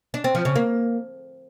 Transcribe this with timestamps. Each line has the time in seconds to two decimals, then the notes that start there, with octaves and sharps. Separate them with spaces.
0.14 D4
0.24 C4
0.35 F3
0.45 C#3
0.55 A#3